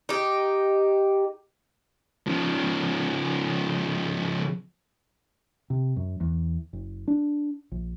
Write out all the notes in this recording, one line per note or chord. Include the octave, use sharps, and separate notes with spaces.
D#4 G4
C#3 F3
C3
F#2
E2
F#1
D4
A#1